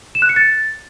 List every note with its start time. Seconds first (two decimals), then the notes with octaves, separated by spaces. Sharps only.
0.15 E7
0.22 F#6
0.29 C#7
0.36 A6